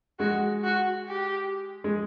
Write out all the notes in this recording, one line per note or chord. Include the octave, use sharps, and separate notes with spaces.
G#3 F#4
F#4
G4
G#3